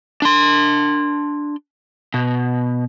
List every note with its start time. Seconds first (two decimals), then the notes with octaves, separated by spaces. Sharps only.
0.22 D4 C6
2.14 B2